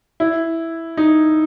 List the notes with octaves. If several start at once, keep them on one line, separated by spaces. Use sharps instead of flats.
E4
D#4